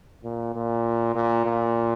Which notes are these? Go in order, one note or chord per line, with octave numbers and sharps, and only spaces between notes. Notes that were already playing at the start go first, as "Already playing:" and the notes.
A#2
A#2
A#2
A#2